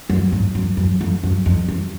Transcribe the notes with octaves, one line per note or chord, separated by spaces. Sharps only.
F#2
G#2
F#2
F#2
F2
F#2
F2
F#2